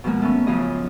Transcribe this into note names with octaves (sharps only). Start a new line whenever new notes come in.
B2 F3 G#3 A#3
A3 B3 C#4
F#2 C#3 F3 F4 G#4 D#5